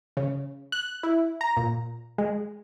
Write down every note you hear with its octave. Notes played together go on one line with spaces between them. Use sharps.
C#3
F#6
E4
A#5
A#2
G#3